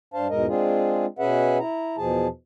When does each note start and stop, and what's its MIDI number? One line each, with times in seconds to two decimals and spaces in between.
0.14 0.27 43
0.14 0.27 62
0.14 0.27 72
0.14 0.27 77
0.14 0.27 81
0.30 0.46 40
0.30 0.46 44
0.30 0.46 47
0.30 0.46 56
0.30 0.46 70
0.30 0.46 75
0.47 1.06 56
0.47 1.06 60
0.47 1.06 62
0.47 1.06 65
0.47 1.06 68
1.19 1.58 47
1.19 1.58 61
1.19 1.58 68
1.19 1.58 71
1.19 1.58 76
1.19 1.58 78
1.59 1.96 64
1.59 1.96 82
1.98 2.27 40
1.98 2.27 47
1.98 2.27 53
1.98 2.27 68
1.98 2.27 81